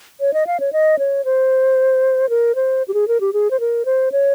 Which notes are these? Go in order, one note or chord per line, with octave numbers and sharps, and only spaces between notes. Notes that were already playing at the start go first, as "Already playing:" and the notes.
C#5
D#5
F5
C#5
D#5
C#5
C5
A#4
C5
G4
G#4
A#4
G4
G#4
C5
A#4
C5
C#5